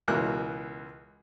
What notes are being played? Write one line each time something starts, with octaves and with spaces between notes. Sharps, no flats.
C#2 B2 E3 A#4 F#6